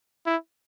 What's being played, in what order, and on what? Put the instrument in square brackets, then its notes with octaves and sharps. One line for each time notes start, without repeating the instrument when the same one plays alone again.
[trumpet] E4